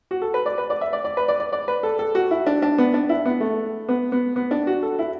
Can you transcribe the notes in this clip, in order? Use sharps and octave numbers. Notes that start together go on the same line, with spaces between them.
F#4
A4
B4
D5
B4
D5
E5
D5
D5
B4
D5
D5
D5
B4
A4
A4
F#4
E4
D4
D4
B3
D4
E4
B3
A3
B3
B3
B3
D4
F#4
A4
E4